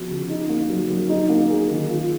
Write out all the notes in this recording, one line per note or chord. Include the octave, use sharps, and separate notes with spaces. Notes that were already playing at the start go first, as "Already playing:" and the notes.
Already playing: F3 B3 F#4
C#3
D#4
A#3
F#3
F#3
D#4
A#3
G#4
D#3
F4